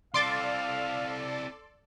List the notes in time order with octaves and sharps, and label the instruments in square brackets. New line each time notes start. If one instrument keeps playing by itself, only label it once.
[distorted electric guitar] C4 E4 [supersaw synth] A4 D5 [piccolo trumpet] F5 [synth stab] C6 D6 A6